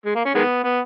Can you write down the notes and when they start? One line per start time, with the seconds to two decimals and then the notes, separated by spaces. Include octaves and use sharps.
0.05 G#3
0.15 A#3
0.25 C#4
0.35 D#3 G#3 B3
0.64 B3